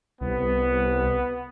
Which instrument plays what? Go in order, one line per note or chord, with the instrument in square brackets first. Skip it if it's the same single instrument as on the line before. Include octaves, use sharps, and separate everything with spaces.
[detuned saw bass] C2 [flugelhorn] B3